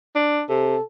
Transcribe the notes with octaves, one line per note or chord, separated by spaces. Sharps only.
D4
C3 A4